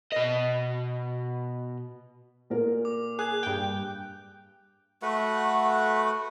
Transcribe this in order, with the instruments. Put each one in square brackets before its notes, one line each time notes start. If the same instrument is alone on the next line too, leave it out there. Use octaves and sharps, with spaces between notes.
[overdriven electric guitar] B2 D#5
[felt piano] A#2 A#4
[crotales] D6
[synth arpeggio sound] G#4 [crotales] F#6
[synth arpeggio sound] G2 G5
[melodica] A3 F#4 B4 F#5